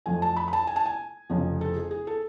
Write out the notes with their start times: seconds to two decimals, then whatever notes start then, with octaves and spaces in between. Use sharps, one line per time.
0.06 F2 F3 A3 G#5
0.22 A5
0.36 B5
0.48 B5
0.53 A5
0.67 G#5
0.76 A5
0.86 G#5
1.30 F1 F2 C#3 F3
1.61 A4
1.76 G#4
1.91 G#4
2.07 A4